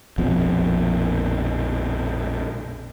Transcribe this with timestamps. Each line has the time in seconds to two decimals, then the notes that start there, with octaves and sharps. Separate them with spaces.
0.18 A#1 F2 B2